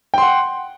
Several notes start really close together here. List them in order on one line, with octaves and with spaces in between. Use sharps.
G5 C6 F#5